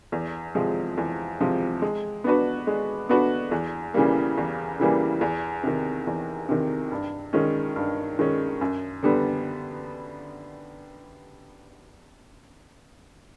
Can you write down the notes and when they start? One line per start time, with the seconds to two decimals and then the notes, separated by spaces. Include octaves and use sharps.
0.12 E2
0.55 C3 F3 G#3
0.97 E2
1.40 C3 F3 G#3
1.82 G#3
2.24 B3 D4 F#4 B4
2.67 G#3
3.09 B3 D4 F#4 B4
3.51 E2
3.94 C#3 E3 G3 A#3
4.37 E2
4.80 C#3 E3 G3 A#3
5.21 E2
5.63 C3 D#3
6.07 E2
6.49 C3 D#3
6.92 G2
7.33 D#3 G#3 C#4
7.76 G2
8.19 D#3 G#3 C#4
8.61 F#2
9.03 D3 G3 B3